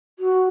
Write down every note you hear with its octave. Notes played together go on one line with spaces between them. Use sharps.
F#4